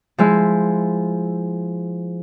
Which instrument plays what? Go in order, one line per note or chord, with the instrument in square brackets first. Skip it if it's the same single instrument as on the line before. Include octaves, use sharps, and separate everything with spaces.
[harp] F3 G#3 E4